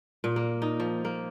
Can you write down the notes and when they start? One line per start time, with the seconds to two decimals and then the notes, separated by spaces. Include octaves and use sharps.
0.24 A#2
0.36 A#3
0.62 D#4
0.80 F3
1.05 A#3